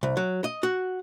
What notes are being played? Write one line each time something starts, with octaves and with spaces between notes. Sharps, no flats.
C2
F#3
D#5
F#4